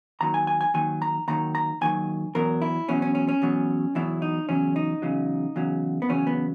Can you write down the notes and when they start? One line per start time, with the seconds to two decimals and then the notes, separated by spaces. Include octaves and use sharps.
0.21 D#2 D#3 F#3 A#5
0.34 G#5
0.47 G#5
0.61 G#5
0.74 D#2 D#3 F#3 G#5
1.02 A#5
1.28 D#2 D#3 F#3 A#5
1.55 A#5
1.81 D#2 D#3 F#3 G#5
2.35 E2 B2 F#3 A#4
2.62 E4
2.89 E2 B2 F#3 C#4
3.02 C#4
3.15 C#4
3.29 C#4
3.42 E2 B2 F#3
3.95 E2 B2 F#3 E4
4.22 D#4
4.49 E2 C#3 F#3 C#4
4.76 D#4
5.02 E2 C#3 F#3
5.56 E2 C#3 F#3
6.02 B3
6.09 E2 C#3 F#3 C#4
6.27 B3